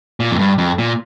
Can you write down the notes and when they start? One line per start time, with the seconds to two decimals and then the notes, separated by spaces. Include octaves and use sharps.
0.20 A#2
0.31 F2
0.39 G2
0.58 F2
0.78 A#2